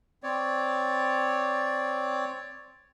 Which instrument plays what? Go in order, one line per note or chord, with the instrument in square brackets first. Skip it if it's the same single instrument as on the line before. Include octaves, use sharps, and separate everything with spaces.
[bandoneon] C4 C#5 D5